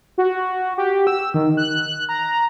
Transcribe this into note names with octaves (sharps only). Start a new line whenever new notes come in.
F#4
G4
E6
D#3
F#6
A#5